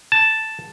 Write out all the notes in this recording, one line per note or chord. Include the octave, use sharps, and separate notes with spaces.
A5